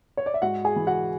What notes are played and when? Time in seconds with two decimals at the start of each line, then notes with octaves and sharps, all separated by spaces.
0.17 C#5
0.26 D5
0.34 E5
0.42 G#2 F#4 F#5
0.65 G#4 G#5
0.76 E3
0.87 F#4 F#5